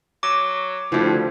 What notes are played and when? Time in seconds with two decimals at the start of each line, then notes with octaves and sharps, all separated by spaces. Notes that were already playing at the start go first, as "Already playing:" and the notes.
0.23 F#3 D6
0.92 D2 G2 F3 E4